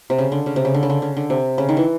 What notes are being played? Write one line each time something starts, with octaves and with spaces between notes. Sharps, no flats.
C3
C#3
D3
C#3
C3
C#3
D3
C#3
D3
C#3
D3
C3
C#3
D#3
E3